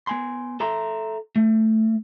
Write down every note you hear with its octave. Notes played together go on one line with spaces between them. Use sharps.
B3 G#5 C6
A4 E5 A#5 C6
A3